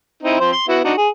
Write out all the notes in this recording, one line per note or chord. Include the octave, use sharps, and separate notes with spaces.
C4 D#4 E4
F3 C4 C5
C6
B3 E4 F#4
D4 D#4 F#4
G#4